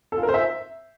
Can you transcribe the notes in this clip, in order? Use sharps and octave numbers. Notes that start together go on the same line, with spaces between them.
A4
F4
A#4
C5
E5